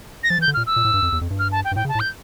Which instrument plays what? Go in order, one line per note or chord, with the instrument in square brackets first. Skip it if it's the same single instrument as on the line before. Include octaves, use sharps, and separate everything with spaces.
[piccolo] A#6
[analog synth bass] F3 [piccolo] A6
[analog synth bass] E3
[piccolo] G6
[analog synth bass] D3
[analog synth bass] A#2 [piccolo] F6
[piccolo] E6
[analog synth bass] A#2
A2
G2
F2
E2
F2
G2
[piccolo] F6
A5
G5
[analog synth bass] G2
[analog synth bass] A2 [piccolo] G5
[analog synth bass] C#3
[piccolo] A5
[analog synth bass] A2
[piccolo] G6